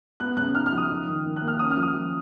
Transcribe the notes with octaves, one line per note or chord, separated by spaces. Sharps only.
B3 F#6
C#3 F#6
D#4 F6
F6
F3
D#6
D#4
D#3
D#3
F#6
A#3
F6
C#4 D#6
F6
F3
D#6
F3